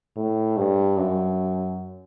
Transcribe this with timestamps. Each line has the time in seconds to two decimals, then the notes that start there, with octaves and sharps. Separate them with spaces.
0.16 A2
0.57 G2
0.97 F#2